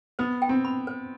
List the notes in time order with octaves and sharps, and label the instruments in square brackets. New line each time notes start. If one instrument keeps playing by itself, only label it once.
[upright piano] B3 [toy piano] C5
[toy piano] G5
[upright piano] C4
[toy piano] B5
C5